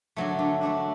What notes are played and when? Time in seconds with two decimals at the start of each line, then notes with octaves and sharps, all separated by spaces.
0.16 D3 F#3 A3
0.39 D3
0.61 A3 D4 F#4